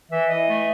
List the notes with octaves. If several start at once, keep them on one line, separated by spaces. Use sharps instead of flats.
E3 E5
E3 D#5
A3